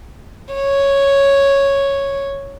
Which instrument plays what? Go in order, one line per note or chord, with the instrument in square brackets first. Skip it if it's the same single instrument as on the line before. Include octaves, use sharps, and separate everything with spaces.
[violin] C#5